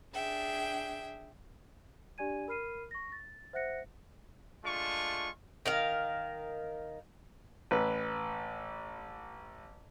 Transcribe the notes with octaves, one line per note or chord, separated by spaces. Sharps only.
D4 G#4 E5 G5
D4 G4 D5 G#5 G#6 D#7
A#4 B5 F6 C7 D#7
C#6 A#6
A6
C5 E5 F#5 F#6 A#6 C#7
G#3 A3 D4 F4 C#6
D#3 A#4 F5
A1 B4